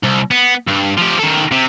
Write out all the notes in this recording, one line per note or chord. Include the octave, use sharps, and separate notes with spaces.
C2
B3
G2
F3 G4
D#3 A4
C3